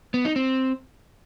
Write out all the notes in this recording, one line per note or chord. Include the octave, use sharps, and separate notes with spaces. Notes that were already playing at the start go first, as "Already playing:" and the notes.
B3
D#4
C4